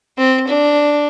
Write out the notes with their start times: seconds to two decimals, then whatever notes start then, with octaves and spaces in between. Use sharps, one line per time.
0.18 C4
0.47 D4